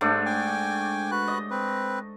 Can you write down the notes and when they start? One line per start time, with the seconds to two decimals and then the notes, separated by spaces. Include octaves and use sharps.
0.01 G#2 A3 D4
0.26 G5 G#5 D6
1.11 F#4 B4 F#6
1.28 D#5
1.51 C4 B4